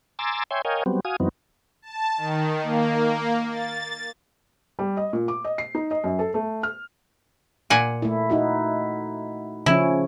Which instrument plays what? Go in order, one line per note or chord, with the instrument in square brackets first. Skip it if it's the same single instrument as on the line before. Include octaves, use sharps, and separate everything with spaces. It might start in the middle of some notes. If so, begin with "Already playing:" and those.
[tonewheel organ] G#5 A#5 C6 D6 E6 A6
C#5 E5 G5 G#5 C6
A#4 C#5 D#5 F5 G5 G#5
F#3 G3 B3 C4
F#4 F5 G#5 D#6
F#2 E3 F#3 B3 C4 D#4
[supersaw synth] A5
D#3
A#3
A6
[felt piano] G3
D#5
A#2
D6
D#5
C7
D#4
D#5
F#2
A4
A3
F6
[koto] A#2 F#5 G#5
[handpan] A3 E4
D#4 E4 F#4
[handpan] C#3 F3 C#4 [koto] E4